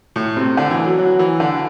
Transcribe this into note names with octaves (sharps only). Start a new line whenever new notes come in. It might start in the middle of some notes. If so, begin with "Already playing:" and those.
A2
C3
D3
E3
F#3
F#3
E3
D3